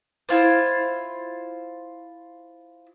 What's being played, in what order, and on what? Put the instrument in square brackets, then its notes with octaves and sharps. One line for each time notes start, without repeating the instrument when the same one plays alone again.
[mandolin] E4 F4 C5